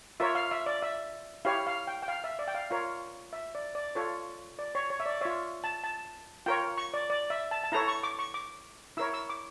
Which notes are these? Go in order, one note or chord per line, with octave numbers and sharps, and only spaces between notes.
F4 A#4 C#5 E5
F5
E5
D5
E5
E4 G4 C#5 F5
F5
G5
G5
F5
E5
D5
G5
F5
F4 A#4 C#5 F5
E5
D5
D5
F4 A4 C#5
D5
C#5
C#5
E5
D5
F4 C#5 E5
A5
A5
F4 A#4 C#5 G5
C#6
D5
D5
E5
A5
A5
E4 A4 C#5 A#5
C#6
D6
C#6
D6
E4 A#4 C#5 E6
E6
D6